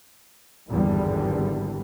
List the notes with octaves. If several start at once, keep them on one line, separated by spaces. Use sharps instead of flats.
G#1 E2 G2 D3 E3 G3